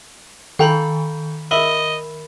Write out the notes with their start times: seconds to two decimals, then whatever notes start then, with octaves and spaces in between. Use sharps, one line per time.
0.59 D#3 A4 F5 G5 A#5 B5
1.51 A#4 D#5 E5 B5